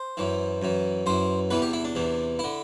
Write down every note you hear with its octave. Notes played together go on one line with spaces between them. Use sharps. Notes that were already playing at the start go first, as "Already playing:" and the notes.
Already playing: C5
F#2 E3
F#2 E3
F#2 E3 C5
E2 C3 E3 B4
G4
E4
D4
E2 C3 E3
D3 E4